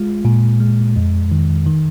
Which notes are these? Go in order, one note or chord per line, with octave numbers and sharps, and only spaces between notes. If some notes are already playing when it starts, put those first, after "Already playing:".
Already playing: G#3 F4
A#2
G#3
F2
D#3
D#3